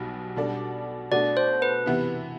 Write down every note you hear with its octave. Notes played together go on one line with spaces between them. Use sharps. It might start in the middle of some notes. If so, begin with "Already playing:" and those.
Already playing: B1 B2 G3
B2 G3 D4 A4 D5
B2 A3 D4 F#4 D5
C5
B4
C3 E3 B3 E4